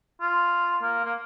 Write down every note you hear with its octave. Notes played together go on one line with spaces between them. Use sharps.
F4
A#3
A#3